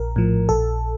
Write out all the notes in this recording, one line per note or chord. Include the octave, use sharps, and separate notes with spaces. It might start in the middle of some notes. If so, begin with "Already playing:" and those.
Already playing: A#1 A#4
A2 F3
A#1 A4